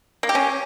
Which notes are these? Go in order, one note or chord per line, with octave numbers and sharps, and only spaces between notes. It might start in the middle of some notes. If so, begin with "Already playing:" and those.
A#3
G4
C#4